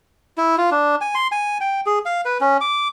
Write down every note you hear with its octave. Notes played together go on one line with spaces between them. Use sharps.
E4
F4
D4
G#5
C6
G#5
G5
G#4
F5
B4
C#4
D6